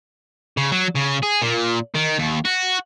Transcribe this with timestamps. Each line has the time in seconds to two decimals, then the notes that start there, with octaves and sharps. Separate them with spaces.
0.57 C#3
0.72 F#3
0.96 C#3
1.23 G#4
1.42 A#2
1.95 D#3
2.19 D#2
2.45 F#4